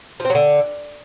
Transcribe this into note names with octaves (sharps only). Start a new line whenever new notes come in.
F3
C4
F#3
D3